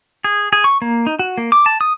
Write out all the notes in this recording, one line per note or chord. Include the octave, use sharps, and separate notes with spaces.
G#4
G#4
C#6
A#3
D#4
F#4
A#3
D6
A5
D#6